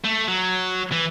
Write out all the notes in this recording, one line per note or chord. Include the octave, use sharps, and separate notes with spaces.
A3
F#3
E3